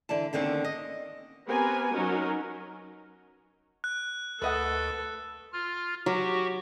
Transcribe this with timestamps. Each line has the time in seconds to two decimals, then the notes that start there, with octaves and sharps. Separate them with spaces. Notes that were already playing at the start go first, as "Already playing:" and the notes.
0.09 D3 E3 D5 A5
0.33 D#2 D3 D#3 C4 C#4
0.64 D#5
1.48 B3 C4 G4 A#4 B4 G#5
1.91 F#3 C#4 D#4 F#4 A#4
3.84 F#6
4.42 D2 A4 B4 D#5 F#5
5.53 F4 F6
6.06 F#3 F#4 G4 C#6